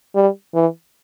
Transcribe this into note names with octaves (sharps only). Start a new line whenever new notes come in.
G3
E3